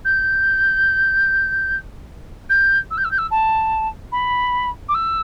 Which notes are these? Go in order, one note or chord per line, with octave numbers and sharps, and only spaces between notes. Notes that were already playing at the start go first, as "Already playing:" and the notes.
G6
G6
E6
G6
E6
G6
E6
A5
B5
D6
E6